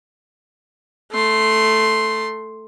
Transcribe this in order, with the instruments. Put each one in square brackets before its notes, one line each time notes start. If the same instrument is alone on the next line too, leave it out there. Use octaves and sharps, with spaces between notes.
[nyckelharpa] A3 C6